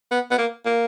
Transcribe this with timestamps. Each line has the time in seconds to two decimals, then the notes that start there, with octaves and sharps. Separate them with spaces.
0.11 B3
0.31 B3
0.38 A#3
0.65 A#3